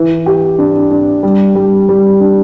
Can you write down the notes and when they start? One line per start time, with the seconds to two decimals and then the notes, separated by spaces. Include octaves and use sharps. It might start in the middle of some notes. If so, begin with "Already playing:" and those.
Already playing: E3
0.26 G4
0.58 D4
0.91 D4
1.23 G3
1.55 G3
1.89 G3
2.20 D4